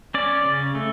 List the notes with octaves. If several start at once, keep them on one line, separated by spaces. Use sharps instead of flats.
C#4 D5
C#3
A3